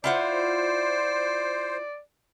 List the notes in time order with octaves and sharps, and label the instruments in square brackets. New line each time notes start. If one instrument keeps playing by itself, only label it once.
[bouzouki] E4 F4 F#5 [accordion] C5 [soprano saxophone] D5